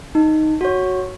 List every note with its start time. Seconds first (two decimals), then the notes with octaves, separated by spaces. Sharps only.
0.15 D#4
0.61 F#4 C#5